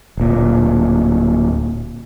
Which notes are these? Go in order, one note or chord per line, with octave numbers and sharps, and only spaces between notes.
D1 A#2